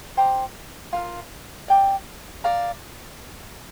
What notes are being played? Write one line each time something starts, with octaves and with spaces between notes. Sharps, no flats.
C5 G5 A#5 D6
F4 A#4 F5
D5 G5 D6
D5 F5 A#5